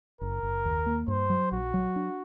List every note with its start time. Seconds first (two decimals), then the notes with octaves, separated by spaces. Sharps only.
0.21 F#1 A#4
0.43 F#1
0.65 D#2
0.86 A#3
1.08 G2 C5
1.30 F#3
1.52 A#1 F#4
1.74 F#3
1.96 D4